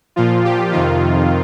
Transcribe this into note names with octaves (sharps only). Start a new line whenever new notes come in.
A#2 F3 F4
G4
F2 C3 D#3 F4